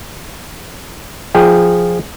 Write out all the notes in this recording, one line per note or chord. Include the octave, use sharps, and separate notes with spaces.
F3 G#4 G5